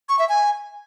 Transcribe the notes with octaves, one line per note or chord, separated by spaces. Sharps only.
C#6
E5
G#5